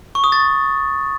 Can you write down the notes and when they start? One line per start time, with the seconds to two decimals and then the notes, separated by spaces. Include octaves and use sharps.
0.15 C#6
0.24 D#6
0.32 A6